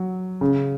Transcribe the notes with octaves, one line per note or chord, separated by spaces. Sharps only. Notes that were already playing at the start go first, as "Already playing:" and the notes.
Already playing: F#3
C#3